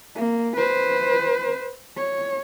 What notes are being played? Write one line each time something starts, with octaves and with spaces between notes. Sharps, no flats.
A#3
B4 C5
C#5